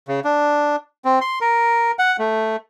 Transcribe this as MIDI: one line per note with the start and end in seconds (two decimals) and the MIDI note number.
0.08 0.20 49
0.24 0.76 62
1.05 1.19 60
1.21 1.39 84
1.41 1.92 70
1.99 2.16 78
2.19 2.56 57